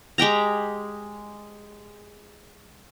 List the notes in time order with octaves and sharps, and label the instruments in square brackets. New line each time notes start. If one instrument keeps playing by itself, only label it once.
[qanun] G#3 G4 G5 A#5